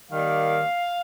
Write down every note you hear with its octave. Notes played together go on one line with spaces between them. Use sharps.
D#3 G3 A#3 F5